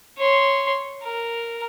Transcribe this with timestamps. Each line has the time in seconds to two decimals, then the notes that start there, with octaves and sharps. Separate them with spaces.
0.18 C#5 C6
1.03 A#4